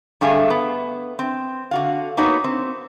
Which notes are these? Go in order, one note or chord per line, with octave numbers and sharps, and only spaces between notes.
G2 D3 A3 G#4 F5 G#5
B3
C4
D3 F#4 F5
A#3 B3 D#4 F#4 B4 C#5
C4